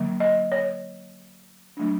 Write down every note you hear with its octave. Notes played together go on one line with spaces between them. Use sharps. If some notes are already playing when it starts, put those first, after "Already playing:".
Already playing: D3 F#3 A#3
D#5
C#5
F#3 A3 D4